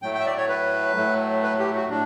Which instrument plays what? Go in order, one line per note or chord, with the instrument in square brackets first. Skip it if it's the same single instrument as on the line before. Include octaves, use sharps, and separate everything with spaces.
[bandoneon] A2 F#3 A3 G5
G5
E5
D5
C#5
B4
A2 F#3 A3
B4
G4
F#4
A2 D4